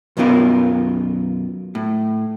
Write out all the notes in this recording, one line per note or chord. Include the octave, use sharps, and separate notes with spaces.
B1 F#2 F#3 B3 F4 A#4
A2